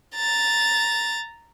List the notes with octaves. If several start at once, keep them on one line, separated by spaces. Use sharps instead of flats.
A#5 A6